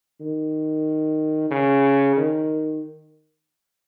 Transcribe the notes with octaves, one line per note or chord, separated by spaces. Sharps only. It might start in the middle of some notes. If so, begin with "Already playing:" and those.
D#3
C#3
D#3